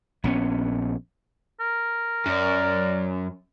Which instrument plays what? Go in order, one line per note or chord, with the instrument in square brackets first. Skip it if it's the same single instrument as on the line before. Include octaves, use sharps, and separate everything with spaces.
[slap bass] A#1 B3 C#4
[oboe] A#4
[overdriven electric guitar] F#2 [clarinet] D5